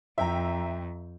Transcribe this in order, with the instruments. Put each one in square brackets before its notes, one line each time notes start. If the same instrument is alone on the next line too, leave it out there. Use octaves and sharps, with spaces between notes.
[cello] F2 [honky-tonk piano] E5 G5 A#5